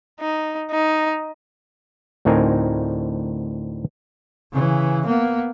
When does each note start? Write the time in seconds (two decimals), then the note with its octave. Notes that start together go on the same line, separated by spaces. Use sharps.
0.20 D#4
0.71 D#4
2.25 D2 A2 C4 D#4 A#4 G#5
4.52 C#3 E3
5.06 A#3 B3